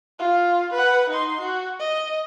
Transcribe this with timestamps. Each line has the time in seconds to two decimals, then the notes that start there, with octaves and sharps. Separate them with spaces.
0.19 F4
0.73 B4 F#5
1.10 D#4 C6
1.41 F#4
1.80 D#5